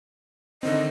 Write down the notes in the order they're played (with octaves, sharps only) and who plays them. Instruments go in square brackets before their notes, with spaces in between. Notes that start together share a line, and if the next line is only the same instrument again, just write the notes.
[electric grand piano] D3 D#3 C4 [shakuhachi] D#5